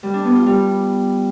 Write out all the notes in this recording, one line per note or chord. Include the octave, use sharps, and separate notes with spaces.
G3
D4
B3
F4
G3